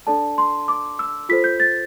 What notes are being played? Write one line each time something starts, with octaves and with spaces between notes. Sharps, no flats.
D4 A4 D5 A5
C6
D6
E6
F4 A4 C5 B6
G6
A6